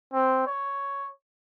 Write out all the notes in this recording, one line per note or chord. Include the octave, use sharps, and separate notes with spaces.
C4
C#5